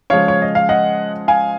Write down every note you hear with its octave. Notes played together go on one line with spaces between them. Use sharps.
C#3 F3 G#3 C#5 F5
C#5
D#5
F5
D#5 F#5
F5 G#5